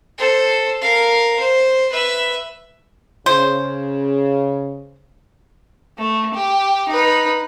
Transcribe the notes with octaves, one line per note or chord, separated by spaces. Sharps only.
A4 C5
A#4 F5
C5
B4 E5
C#3 C5
A3
G4
D#4 B4